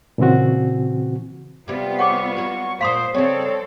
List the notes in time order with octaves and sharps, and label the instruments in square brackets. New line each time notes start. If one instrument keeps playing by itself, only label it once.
[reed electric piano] A#2 C#3 E3 C4 F#4
[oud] C3 G3 [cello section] B3 F4
[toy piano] G#4 C#5 F#5 [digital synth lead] C#6
[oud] F#3 F#4
[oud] A#2 A#3 [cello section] C5 [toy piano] F5 C6 D#6
[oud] C#3 G3 [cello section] C4 A4 [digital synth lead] C#5